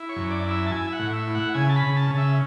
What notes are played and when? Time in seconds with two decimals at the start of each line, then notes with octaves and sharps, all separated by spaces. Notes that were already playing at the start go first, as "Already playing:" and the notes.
Already playing: E4
0.09 C#5
0.16 F#2
0.30 D5
0.44 E4
0.51 E5
0.66 A5
0.71 E4 G#5
0.88 E5
0.92 F#5
0.99 A2
1.13 E5
1.27 E4
1.35 F#5
1.54 C#3 G#5
1.69 A5
1.76 B5
1.83 C#3
1.97 A5
2.11 C#3
2.17 E5